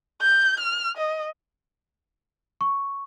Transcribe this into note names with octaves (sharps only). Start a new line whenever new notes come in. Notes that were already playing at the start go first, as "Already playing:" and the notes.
G6
F6
D#5
C#6